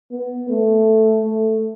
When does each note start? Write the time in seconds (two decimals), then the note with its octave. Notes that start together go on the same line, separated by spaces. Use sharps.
0.11 B3
0.50 A3
1.23 A3